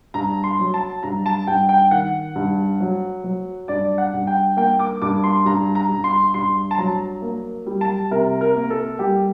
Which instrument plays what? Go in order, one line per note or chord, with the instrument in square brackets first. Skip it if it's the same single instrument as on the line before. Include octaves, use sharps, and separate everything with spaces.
[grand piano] G2 A#5
C6
F#3
A5
G2 A#5
A5
G2 G5
G5
D#3 F#5
G2
F#3
F#3
G2 D5
F#5
G2
G5
A#3 G5
D6
G2 D6
C6
G2 A#5
A#5
G2
C6
G2 C6
A5
F#3 A#5
A#3
G3
A5
C3 A#4
A#4
A#3
A4
G3 G4